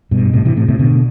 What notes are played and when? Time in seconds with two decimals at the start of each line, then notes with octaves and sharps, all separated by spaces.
0.11 G2 B2
0.33 A2 C3
0.45 C3 E3
0.56 A2 C3
0.68 A2 C3
0.79 B2 D3